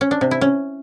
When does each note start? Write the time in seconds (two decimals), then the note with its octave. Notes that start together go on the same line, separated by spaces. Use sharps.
0.01 C#4
0.11 D4
0.21 C3
0.31 E4
0.41 C#4